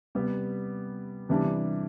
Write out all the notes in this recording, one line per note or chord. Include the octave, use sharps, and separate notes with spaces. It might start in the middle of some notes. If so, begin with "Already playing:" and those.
C3 G3 B3
C3 E3 G3 D4